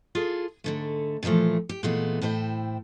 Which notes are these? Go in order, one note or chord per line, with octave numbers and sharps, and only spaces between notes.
F4 G#4 A4
G#2 D3 A3
A#2 D3 E3 F3 A3
G4
A#2 E3 G#3 A3 B3
A2 E4 C5 C#5 G5